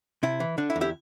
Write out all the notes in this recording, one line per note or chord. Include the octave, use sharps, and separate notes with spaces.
C3 E4
E3
D3 D4
E4
E2
E4 G4